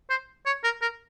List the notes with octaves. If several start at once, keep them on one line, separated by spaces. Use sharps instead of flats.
C5
C#5
A#4
A#4